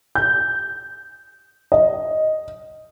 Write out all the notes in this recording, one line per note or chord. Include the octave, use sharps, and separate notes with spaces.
G6
D#5